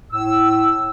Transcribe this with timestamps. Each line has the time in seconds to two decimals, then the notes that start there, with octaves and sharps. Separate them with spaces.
0.12 A2 E6